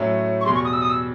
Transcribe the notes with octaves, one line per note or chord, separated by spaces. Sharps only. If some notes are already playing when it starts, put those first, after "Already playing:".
Already playing: A2 F#3 A3 C#4 E4
C#6
E2 B2 G3 C6
C#6
D#6
E6
D#6
E6